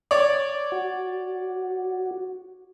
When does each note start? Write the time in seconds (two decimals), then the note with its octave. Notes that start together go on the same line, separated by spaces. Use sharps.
0.11 C#5 D5
0.72 F#4